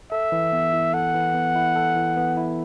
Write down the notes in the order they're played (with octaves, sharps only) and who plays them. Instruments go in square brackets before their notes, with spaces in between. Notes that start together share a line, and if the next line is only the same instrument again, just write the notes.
[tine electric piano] A4 [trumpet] E5
[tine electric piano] E3
B3
E4
[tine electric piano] A4 [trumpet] F#5
[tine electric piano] E3
B3
E4
A4
E3
B3
E4